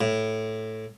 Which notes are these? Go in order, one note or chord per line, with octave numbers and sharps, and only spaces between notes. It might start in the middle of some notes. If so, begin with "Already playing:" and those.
A2